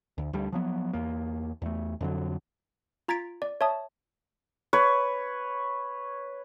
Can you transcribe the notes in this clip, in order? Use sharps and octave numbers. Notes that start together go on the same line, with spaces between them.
D2
D2 D3 G3
F3 F#3 B3
E2 A#3
E2 A3
F2 D3 F#3
F4 A#5 G#6 A6 B6 D7
D5
C#5 E5 A5 D#6
B4 C#5